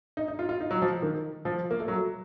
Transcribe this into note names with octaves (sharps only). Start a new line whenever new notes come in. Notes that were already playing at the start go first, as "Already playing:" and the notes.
D#4
D#4
F4
F4
D#4
F#3
F3
D#3
F3
A#3
A3
F#3